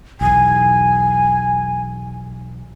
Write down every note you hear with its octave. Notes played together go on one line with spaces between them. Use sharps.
B1 E2 G#5